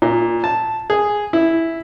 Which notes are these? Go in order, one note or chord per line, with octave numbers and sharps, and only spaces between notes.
A#2
A5
G#4
E4